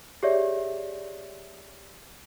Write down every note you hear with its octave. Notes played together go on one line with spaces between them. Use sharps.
G4 G#4 C#5 D5 E5